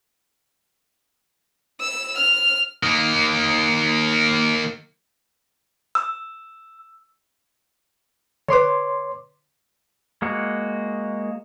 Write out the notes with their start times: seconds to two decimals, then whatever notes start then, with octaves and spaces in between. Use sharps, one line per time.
1.80 E6
2.18 F6
2.83 D#3 A#3
5.95 E6
8.48 D3 B4 C#5 C6 D6
10.22 G#3 A#3 F#4